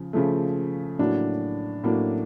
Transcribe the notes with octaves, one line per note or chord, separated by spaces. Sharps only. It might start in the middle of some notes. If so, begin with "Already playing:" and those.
Already playing: C#3 F3
C#3 F3 A3
A2 F#3 A#3 D4
A2 F#3 A#3 D4